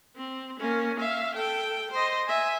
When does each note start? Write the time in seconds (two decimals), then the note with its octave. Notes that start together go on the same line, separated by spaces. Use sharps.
0.16 C4
0.59 A#3 C#4
1.00 E5 F5
1.35 A4 G5
1.91 C5 D#5
2.28 E5 G#5